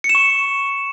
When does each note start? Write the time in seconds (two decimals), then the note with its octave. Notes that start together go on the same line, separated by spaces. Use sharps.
0.04 C#7
0.09 E7
0.15 C#6